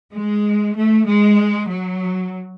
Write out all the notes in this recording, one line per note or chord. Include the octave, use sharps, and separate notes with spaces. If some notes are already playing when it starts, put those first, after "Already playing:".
G#3
A3
G#3
F#3